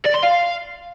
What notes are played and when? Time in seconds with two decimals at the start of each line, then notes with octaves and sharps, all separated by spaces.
0.05 D5
0.14 C6
0.23 F5